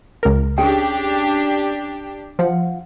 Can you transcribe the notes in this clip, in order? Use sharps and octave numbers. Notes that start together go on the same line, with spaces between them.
C#2 A#4
C#4 D4 G4 G#4 G5
F3 F4 F5 F#5